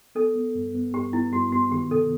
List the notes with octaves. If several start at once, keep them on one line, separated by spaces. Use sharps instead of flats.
B3 A4
B3
G2
B3
G2 G4
B3 E4
G2 F#4
B3 F#4
D#3 G4
C3 A4